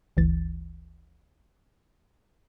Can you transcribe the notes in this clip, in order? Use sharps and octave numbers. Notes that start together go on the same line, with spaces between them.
G1 D2 E3 A6